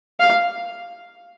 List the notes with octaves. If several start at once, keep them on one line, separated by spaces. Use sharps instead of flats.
F5